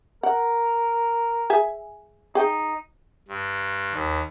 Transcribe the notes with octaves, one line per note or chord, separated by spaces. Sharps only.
A#4 F#5
G#4 E5 G#5
D#4 G#4 G5
G2
D#2